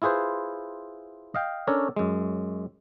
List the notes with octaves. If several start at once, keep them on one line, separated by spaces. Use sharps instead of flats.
E4 F4 G#4 B4 C5
D#5 F5 G5
C#4 D4 A4 A#4 C#5
F#2 G#3